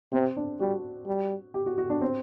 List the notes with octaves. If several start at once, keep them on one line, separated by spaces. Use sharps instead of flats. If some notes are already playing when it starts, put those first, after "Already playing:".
C3 C4
D4
G3 F#4
G3
G4
F#4
F#4
D4
C4